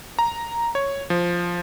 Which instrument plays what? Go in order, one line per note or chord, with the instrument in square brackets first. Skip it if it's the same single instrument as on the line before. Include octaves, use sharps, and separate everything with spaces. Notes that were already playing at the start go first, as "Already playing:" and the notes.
[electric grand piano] A#5
C#5
F3